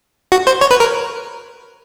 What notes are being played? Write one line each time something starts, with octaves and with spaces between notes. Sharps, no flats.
F#4
C5
C#5
B4
A#4